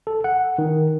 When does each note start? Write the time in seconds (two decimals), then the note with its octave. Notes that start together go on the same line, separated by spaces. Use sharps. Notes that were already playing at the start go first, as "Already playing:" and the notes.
0.07 A4
0.24 F#5
0.58 D#3